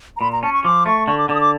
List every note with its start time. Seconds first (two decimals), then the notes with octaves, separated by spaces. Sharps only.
0.17 A#5
0.21 A#2 B5
0.32 A#5
0.43 C#4 A5
0.53 C#6
0.64 F3 D6
0.86 A3 C#6
1.08 D3 C#6
1.18 D6
1.29 D3 D6
1.35 D#6
1.41 D6